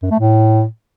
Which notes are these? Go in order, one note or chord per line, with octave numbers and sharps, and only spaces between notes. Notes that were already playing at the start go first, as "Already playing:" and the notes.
F#2
A3
A2